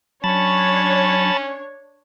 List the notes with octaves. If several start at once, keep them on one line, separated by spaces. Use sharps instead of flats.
F#3 C#4 D4 C#5 A5 B5 A6